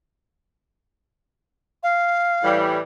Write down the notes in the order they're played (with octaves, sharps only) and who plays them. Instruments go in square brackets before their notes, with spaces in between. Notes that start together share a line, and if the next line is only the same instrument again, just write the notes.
[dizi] F5
[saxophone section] A2 E3 G3